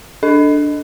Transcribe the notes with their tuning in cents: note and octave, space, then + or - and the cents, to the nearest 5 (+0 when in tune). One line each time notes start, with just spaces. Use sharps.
D4 +0 A4 +5 D#5 +0